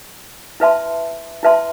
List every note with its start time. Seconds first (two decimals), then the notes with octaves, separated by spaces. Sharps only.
0.60 E4 B4 E5 A5 C6
1.43 E4 B4 E5 A5 C6